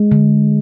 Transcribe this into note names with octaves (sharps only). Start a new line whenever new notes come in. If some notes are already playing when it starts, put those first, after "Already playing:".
Already playing: G#3
D3